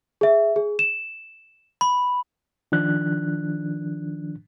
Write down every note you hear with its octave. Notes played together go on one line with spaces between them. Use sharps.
G#4 E5
G#4
E7
B5
D#3 F3 D4 F#6